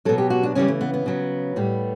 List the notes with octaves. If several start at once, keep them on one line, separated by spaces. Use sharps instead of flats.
B2 F#3 A4
G4
F#4
D4
C#3 E3 G3 C#4
A3
B3
B3
C#3 F#3
A2 G3